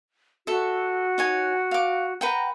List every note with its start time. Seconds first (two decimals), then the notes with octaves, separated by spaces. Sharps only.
0.47 F#4 A4 E5
1.18 D#4 C#5 G#5
1.71 F5 D6
2.21 B4 F#5 G5 A#5